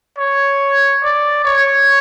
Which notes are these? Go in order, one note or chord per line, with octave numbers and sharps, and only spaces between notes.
C#5
D5
C#5